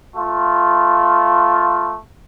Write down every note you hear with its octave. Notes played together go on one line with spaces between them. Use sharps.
A3 F4